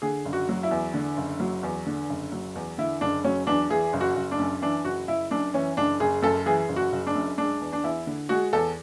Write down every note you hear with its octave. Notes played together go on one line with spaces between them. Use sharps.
D3 G#4
F#1
F#4
F#3
E4
E2
D3
F#1
F#3
E2
D3
F#1
F#3
E2
D3 E4
F#1 D4
F#3 C#4
E2 D4
E3 G#4
F#1
F#4
F#1
D4
F#2
E3 D4
F#1 F#4
F#1 E4
F#2 D4
E3 C#4
F#1 D4
F#1 G#4
F#2 A4
E3 G#4
F#1
F#4
F#1
D4
F#2
G#3 D4
E2
D4
E2 E4
D3
G#3 F#4
E2 A4